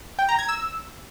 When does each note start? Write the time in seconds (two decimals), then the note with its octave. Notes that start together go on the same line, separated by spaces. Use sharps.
0.19 G5
0.29 A#5
0.39 G#6
0.48 E6